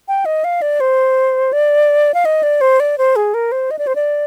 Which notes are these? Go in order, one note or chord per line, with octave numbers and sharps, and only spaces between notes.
G5
D#5
F5
D5
C5
D5
F5
D#5
D5
C5
D5
C5
G#4
A#4
C5
D#5
D5
C5
D5